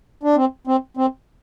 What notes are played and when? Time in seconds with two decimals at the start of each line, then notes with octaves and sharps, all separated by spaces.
0.23 D4
0.36 C4
0.67 C4
0.97 C4